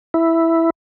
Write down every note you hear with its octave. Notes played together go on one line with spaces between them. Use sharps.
E4